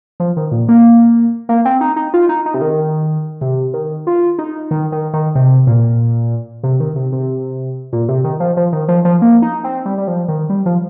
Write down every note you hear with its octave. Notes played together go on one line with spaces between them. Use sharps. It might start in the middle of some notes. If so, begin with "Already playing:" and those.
F3
D#3
A#2
A#3
A#3
C4
D#4
D#4
F4
D#4
D#4
C3
D#3
C3
D#3
F4
D#4
D#3
D#3
D#3
C3
A#2
C3
D#3
C3
C3
A#2
C3
D#3
F3
F3
D#3
F3
F3
A#3
D#4
C4
G3
G3
F3
D#3
G3
F3